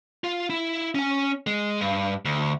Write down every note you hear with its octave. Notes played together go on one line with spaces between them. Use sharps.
F4
E4
C#4 G#5
G#3
G2
D2